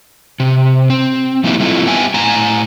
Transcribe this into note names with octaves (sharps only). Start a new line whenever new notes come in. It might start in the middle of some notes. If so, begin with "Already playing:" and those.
C3
C4
C#3 F3 A#3 D#4 E4 G4
G3 A3 C4 E4 F4 D#5
B3 G4 E5 G5 G#5
A2 G#5 A#5